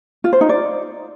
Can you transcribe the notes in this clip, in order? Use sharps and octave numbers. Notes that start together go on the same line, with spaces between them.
F4
C5
D#4
D5